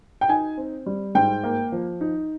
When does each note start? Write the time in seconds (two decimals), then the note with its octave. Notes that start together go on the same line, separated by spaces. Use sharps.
0.21 G5
0.29 D#4 G#5
0.57 C4
0.86 G3
1.15 G#2 G5
1.44 A#3
1.72 F3
2.01 D#4